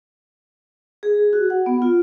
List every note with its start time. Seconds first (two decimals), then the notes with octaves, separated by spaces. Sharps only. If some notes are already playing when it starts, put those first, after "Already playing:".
1.03 G#4
1.33 F#4
1.50 F#5
1.66 B3
1.82 F4